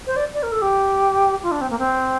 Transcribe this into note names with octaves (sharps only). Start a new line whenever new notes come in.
C5
D5
D5
A#4
A4
G4
F4
D4
C4
A#3
C4